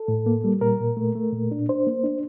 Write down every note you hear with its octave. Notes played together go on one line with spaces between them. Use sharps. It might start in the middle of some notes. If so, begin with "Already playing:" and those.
Already playing: A4
A2
A#3
G3
A#2 A#4
A#2
A3
A3
A#2
D4
D4 C5
A#3
D4